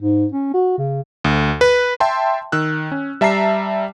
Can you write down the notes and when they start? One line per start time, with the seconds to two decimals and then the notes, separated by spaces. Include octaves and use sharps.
0.01 G#2
0.32 C#4
0.54 F#4
0.78 C#3
1.24 D2
1.61 B4
2.00 E5 G5 A5 C6
2.52 D#3 E6 F#6
2.92 C#4
3.21 G3 E5 A5 A#5 C7